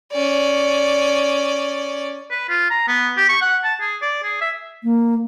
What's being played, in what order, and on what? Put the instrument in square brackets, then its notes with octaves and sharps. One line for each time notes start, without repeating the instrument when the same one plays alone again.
[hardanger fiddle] C#4 D5
[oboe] B4
F4
A#5
B3
G4
C#6
F#5
A5
G#4
D5
G#4
E5
[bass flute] A#3